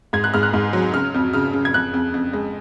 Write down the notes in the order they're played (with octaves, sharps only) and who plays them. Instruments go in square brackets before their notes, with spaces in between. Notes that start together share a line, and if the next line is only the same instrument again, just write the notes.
[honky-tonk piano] G#2 G#6
F#6
G#2 F6
F#6
G#2
F#3
C#3 F6
F2
C#3 F6
C#3
G#6
F2 F#6
F2
F2
G#3